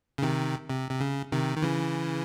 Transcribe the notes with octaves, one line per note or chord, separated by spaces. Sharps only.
C#3
C3 D#3
C3
C3
C#3
C3 D#3
D#3
C#3 E3